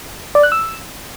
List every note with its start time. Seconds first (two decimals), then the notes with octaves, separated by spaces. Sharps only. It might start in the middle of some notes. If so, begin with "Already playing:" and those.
0.35 D5
0.43 F#6
0.52 E6